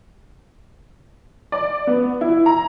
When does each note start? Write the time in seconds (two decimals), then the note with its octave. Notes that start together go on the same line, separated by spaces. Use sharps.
1.52 D5
1.87 B3
2.21 E4
2.46 A#5